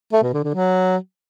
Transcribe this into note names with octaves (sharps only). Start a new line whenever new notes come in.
A3
B2
D3
D3
F#3